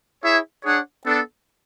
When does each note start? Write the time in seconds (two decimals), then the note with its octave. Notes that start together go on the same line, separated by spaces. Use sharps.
0.22 E4 G#4 C#5 E5
0.63 D4 G#4 C#5 F#5
1.05 B3 D4 A4